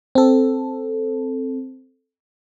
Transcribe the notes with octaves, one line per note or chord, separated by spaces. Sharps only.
C4 A4